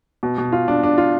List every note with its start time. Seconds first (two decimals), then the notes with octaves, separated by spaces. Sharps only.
0.23 B2
0.38 B2
0.52 F4
0.68 D4
0.83 D4
0.98 F4